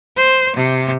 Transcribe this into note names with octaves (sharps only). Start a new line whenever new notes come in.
C5
C3